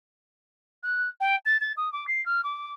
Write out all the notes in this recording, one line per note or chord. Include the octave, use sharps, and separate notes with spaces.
F#6
G5
A6
A6
D#6
D6
C7
F6
D6